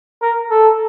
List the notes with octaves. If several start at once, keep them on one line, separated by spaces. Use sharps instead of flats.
A#4
A4